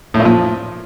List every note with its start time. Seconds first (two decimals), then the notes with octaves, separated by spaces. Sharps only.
0.14 A2
0.20 A#2
0.25 F3